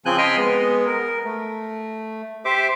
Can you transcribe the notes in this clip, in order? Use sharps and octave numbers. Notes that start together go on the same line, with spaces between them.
C#3 F3 C4 G#5 F#6 G6
D#5 G5 G#5 B5 C6 F6
G#3 B3
A#4
A3
G4 C5 E5 D6